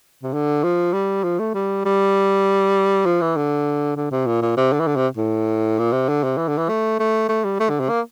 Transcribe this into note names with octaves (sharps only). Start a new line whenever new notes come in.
C3
D3
F3
G3
F3
A3
G3
G3
F3
E3
D3
D3
C3
A#2
A#2
C3
D3
E3
D3
C3
A2
A#2
C3
D3
C3
E3
D3
E3
A3
A3
A3
G3
A3
D3
C3
A#3